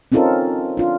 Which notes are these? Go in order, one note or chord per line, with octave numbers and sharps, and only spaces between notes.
C4 C#4 D#4 F4 A4 A#4
D4 F4